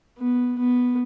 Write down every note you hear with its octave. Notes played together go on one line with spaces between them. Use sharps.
B3
B3